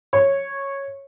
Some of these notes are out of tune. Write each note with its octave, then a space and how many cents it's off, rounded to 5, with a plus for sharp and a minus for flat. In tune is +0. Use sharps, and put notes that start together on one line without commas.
C#5 -10